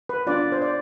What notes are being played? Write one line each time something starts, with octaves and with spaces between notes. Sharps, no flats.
B4
B3 D4 F4 D5
C5
D5